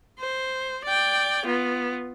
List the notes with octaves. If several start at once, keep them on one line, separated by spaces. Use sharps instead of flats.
C5
D5 G5
B3 F4